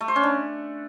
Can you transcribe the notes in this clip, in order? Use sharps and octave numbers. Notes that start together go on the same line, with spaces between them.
A3
C5
C#4
D4